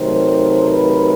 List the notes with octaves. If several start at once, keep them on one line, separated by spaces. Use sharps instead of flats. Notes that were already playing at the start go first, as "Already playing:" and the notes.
Already playing: C3 D#3 F#3 A3 C5
B4